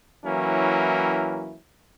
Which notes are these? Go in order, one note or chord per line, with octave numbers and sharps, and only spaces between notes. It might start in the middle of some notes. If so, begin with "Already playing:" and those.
E3 F#3 A#3 C#4 E4